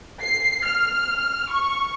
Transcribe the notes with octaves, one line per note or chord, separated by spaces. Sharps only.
C7
F6
C#6